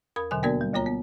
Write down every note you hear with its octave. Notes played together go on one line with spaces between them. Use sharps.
E2 A#4 B5 D#6
D#2 B2 D3 F#3 G#5
A#3 B3 D4 F#4 A#4 D5
G3
D2 A#3 F4 C#5 A#5
B3